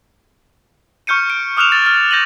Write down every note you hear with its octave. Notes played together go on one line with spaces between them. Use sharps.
C#6 F6 G6 C#7 D#7
D7
D6 D#6 F6 F#6 E7 F7
A6
F6
G6 A#6 D#7 F#7